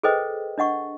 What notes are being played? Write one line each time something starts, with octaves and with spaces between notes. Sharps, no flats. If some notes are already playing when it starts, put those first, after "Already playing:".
G#4 A4 B4 C5 D#5 G5
D4 D#5 F#5 C#6